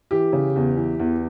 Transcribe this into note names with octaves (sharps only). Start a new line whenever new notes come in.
E3 G4
C#3
E2
E3
E2